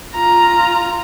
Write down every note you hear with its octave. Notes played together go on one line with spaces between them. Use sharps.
F4 A#5